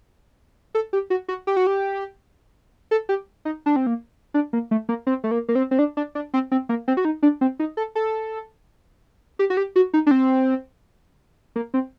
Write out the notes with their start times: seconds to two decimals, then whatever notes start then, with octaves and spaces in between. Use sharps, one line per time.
0.75 A4
0.93 G4
1.10 F#4
1.28 F#4
1.47 G4
1.57 F#4
1.67 G4
2.91 A4
3.09 G4
3.45 D#4
3.66 D4
3.76 C4
3.87 A#3
4.34 D4
4.53 A#3
4.71 A3
4.89 A#3
5.07 C4
5.24 A3
5.31 A#3
5.48 A#3
5.55 C4
5.71 C4
5.79 D4
5.97 D4
6.15 D4
6.34 C4
6.52 C4
6.69 A#3
6.88 C4
6.97 F#4
7.05 D#4
7.23 D4
7.41 C4
7.59 D#4
7.77 A4
7.95 A4
9.39 G4
9.50 F#4
9.57 G4
9.76 F#4
9.94 D#4
10.07 D4
10.11 C4
11.56 A#3
11.74 C4